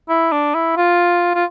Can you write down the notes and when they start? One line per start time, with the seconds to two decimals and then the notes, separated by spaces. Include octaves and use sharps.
0.09 E4
0.32 D4
0.54 E4
0.77 F4
1.35 F4